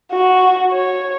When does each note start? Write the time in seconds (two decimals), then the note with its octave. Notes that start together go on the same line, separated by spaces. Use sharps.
0.12 F#4
0.73 C#5